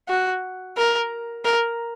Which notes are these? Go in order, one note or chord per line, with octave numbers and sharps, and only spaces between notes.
F#4
A#4
A#4